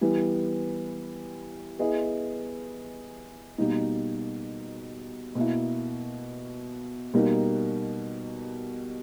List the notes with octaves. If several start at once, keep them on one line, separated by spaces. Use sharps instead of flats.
E3 G3 B3
B3 E4 G#4 D#5
B2 G3 A#3 D#4
B2 A#3 E4
B2 G3 A#3 D#4 A#4